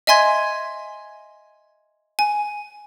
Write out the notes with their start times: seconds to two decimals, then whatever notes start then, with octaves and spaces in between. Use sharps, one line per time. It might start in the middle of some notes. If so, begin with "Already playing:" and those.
0.07 D#5 E5 G#5 C6 G#6
2.19 G#5